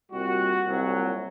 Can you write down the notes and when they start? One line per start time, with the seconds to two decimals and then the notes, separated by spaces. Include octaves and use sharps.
0.12 C2 A#2 G3 F#4
0.67 C2 A#2 F#3